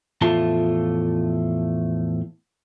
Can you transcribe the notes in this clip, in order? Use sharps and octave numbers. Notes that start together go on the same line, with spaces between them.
E2 A2 F3 A3 F4 A5